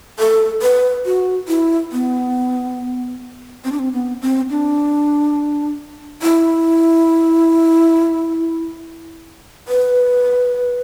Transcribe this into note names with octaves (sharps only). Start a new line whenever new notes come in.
A4
B4
F#4
E4
B3
C4
D4
C4
B3
C4
D4
E4
B4